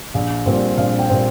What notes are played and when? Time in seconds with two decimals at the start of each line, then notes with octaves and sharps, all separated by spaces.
0.14 A#1
0.46 A#2 G3 C4
0.77 A#1 F5
0.99 G5
1.09 A#2 G3 C4